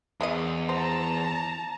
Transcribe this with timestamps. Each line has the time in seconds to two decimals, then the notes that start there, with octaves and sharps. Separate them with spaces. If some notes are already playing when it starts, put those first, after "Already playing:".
0.21 E2 G#3 E4 D#5
0.69 C5 A5 A#5